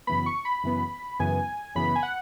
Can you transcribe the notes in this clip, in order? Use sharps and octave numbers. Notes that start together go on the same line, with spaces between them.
F#2 C#3 E3 B3 B5
C#6
B5
F#2 C#3 E3 B3
F#2 C#3 E3 B3 G#5
F#2 C#3 E3 B3 B5
G#5
F#5